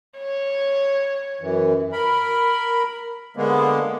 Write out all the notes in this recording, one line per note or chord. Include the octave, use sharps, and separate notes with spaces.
C#5
F#2 E3
A#4 B5
D3 G#3 A#3 B3